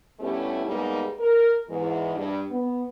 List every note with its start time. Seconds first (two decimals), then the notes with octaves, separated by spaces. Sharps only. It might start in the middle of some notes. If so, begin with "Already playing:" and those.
0.20 G2 B2 A3 C#4 E4 G4
0.65 G#2 G3 A#3 B3 D#4 G#4
1.19 A#4
1.68 E2 G#2 E3
2.17 G2
2.50 B3